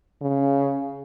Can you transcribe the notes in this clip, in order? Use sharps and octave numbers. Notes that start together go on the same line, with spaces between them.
C#3